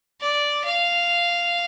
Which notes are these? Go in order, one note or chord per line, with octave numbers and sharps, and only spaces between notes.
D5
F5